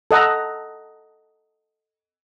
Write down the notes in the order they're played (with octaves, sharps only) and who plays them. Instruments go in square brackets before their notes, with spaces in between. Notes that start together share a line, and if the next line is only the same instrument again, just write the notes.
[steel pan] A4 D#5 F#5 A#5